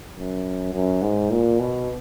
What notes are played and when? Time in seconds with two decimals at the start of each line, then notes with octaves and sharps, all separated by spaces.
0.16 F#2
0.73 F#2
1.02 G#2
1.31 A#2
1.60 B2